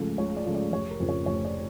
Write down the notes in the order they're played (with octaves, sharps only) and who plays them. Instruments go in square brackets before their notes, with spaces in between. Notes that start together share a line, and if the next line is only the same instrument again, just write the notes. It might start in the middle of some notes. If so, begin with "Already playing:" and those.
Already playing: [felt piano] C#2 C#3 F3 A3
C#2 C#5
D5
C#3 F3 A3
D5
F1 C#5
A#4
F2 C#3
C#5
F1 C#5
D5